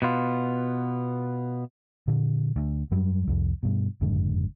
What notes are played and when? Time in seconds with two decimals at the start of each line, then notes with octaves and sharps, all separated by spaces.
0.02 B2 B3 F4
2.08 A#2 D3
2.56 D2
2.91 F#2 F#3 G3
3.27 C2 F2
3.63 G2 B2
4.02 F#1 F2 G#2 D3